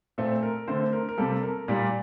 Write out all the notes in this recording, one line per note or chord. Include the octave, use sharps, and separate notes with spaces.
A#2 A3 C4 A4
A#4
D3 A3 C4 C5
A#4
A#4
C3 G3 A#3 A4
A#4
A#2 G3 A#3 D5